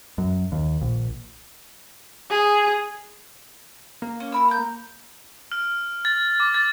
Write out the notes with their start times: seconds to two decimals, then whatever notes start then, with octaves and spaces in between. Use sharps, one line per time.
0.18 F#2
0.52 D#2
0.81 A#1
2.30 G#4
4.02 A#3
4.20 C#4
4.32 E4 B5 E6
4.48 A#5 G6
5.52 F6
6.05 A6
6.40 D6
6.54 A6